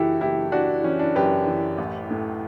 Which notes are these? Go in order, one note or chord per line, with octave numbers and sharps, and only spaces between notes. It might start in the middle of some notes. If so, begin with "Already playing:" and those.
Already playing: F#1 F#2 E3 E4 F#4 G4 A4
F#1 E4 G4
F#1 D4 F#4
E3 C#4
D4
F#2 G4 B4
E3
A1
A2